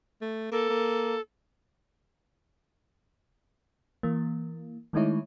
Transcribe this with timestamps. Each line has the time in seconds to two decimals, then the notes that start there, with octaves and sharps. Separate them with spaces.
0.21 A3
0.52 A#3 A4
0.70 A#3
4.03 E3 A#3
4.93 D#3 G#3 A3 D#4 E4 C#5